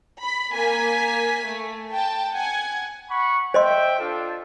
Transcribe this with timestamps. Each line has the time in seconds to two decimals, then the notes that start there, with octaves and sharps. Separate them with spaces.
0.22 B5
0.53 A#3 G#5 B6
1.45 A3
1.92 G5 A5
2.33 F#5 G#5 G#6
3.09 F#5 B5 C#6
3.54 C5 D#5 E5 G5 C6
3.99 D4 F4 A4